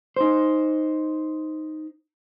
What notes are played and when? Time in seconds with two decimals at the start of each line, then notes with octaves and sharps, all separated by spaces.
0.16 D#4 C5